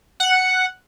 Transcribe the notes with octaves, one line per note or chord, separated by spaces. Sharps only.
F#5